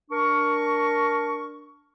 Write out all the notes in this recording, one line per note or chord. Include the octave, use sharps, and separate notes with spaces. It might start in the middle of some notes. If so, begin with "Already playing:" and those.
D4 A#4 C#6